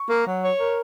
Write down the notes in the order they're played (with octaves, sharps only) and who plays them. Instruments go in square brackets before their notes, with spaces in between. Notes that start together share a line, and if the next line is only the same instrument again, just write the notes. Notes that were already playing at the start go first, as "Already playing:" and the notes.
Already playing: [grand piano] C#6
[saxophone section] A#3
F#3
C#5
A#4